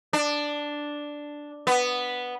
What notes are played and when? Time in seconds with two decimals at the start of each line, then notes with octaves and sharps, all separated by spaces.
0.13 D4
1.67 B3